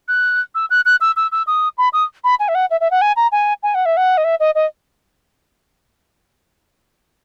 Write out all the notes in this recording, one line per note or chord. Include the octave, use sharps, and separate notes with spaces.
F#6
E6
F#6
F#6
E6
E6
E6
D#6
B5
D#6
B5
G#5
E5
F#5
E5
E5
F#5
G#5
A#5
G#5
G#5
F#5
E5
F#5
D#5
E5
D#5
D#5